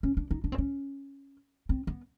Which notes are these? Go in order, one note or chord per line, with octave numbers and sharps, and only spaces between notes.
C#4
D4
D#4
D4
C4
C#4
C4
B3